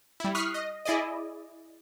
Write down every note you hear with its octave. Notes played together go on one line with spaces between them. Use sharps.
G3 E4
C#6 D#6 F6 F#6 B6 C7
D#5
E4 G#4 D5 D#5